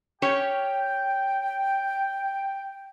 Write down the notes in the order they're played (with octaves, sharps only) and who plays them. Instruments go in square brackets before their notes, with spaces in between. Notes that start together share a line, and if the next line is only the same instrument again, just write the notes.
[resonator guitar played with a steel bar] C#4 G4 C#5 [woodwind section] G5